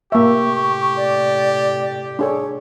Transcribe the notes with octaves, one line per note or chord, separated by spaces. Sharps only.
A2 C3 A#3 G4 E5 C#6
D5
D4 G#4 A4 C#5